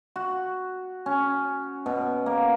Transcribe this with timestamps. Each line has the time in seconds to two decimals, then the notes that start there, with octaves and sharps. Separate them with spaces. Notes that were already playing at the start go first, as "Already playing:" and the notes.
0.16 F#4
1.06 C#4
1.86 B2
2.26 A#3